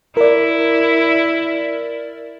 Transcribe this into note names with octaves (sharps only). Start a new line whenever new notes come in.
E4 A#4 D5